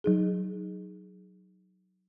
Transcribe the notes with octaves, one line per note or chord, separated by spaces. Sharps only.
F#3 D#4 G#4